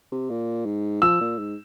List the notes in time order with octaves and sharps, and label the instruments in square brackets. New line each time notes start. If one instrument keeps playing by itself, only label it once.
[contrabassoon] C3
A#2
G#2
[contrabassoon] F3 [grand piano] E6
[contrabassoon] A#2
G#2